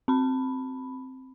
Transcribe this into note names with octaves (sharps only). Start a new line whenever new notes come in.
C4 B5